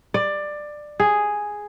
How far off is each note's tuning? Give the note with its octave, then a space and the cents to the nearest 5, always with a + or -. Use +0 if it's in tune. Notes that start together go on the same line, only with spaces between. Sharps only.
D5 +15
G#4 +0